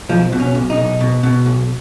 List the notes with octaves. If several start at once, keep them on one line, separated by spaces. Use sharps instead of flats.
B1 F3
B2
C#4
B1
D#4
B1
B2
B2
B1